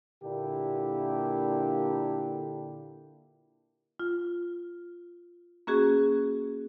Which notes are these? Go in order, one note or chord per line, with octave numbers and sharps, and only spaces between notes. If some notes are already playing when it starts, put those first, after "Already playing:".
A#2 D3 A#3 D4 E4 G4
F4
A#3 C#4 F#4 G#4